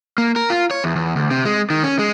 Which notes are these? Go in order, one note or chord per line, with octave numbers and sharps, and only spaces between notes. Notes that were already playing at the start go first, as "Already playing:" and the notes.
A#3
A#4
F4
C#5
E2
E2
D2
C3
G#3
D#3
C#4
G#3